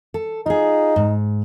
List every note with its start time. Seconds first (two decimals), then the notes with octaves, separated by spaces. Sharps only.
0.14 A4
0.46 D#4 F4 G#4
0.96 G#2